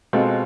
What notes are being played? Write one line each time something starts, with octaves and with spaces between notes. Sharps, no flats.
B2 G#3 C4 F4 A4